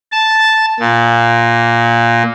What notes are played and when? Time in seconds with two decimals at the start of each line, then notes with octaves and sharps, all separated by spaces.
0.12 A5
0.80 A#2